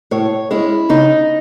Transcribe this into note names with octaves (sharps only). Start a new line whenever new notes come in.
A2 C#5
G#3 C#4 E4
C#3 D#4